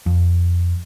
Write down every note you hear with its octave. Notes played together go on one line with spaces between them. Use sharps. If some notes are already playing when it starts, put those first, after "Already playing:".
F2